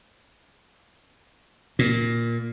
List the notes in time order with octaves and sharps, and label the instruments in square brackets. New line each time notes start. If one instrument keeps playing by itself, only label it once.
[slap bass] A#2